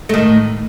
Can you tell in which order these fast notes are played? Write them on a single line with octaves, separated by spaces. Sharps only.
A3 D#3 A2